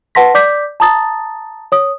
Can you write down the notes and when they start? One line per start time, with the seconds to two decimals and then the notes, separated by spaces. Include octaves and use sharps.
0.15 B4 F#5 A5 C6 A#6 B6
0.34 D5 D6 G6 B6
0.80 A5 A#5 D#6 A6
1.72 C#5 D#6